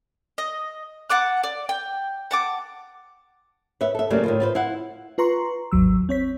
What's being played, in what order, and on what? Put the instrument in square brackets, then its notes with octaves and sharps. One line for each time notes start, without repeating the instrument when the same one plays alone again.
[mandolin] D#5
F#5 A5 D6 F#6
D5
G5
F#5 A5 D6
[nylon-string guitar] B4 C#5 E5
A4 E5
C#3 F#3 G3 A3 A#3 D4
A2 D#3 F4
F4 B4 C5
E4 F5 F#5
[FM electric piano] F4 B4 A#5 C6 C#6
G#1 D#2 F#3 E6
C4 C#5 B6